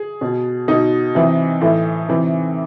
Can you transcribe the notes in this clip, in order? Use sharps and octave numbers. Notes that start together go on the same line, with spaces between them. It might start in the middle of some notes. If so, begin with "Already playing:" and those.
Already playing: G#4
B2
B2 D#4
C3 E3
A2 E3
C3 E3